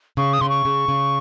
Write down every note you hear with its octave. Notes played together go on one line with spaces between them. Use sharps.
C#3 C#6
D#6
C#3 C6
C#6
C#3
C#3